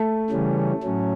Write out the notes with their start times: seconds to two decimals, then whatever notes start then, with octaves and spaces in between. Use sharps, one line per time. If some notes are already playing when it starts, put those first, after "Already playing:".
Already playing: A3
0.30 C#3 E3 G3 C#4
0.83 A2 F#3 C#4